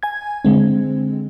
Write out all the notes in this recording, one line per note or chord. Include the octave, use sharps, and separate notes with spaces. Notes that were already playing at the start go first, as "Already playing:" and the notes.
G#5 G#6
D3 G#3 C4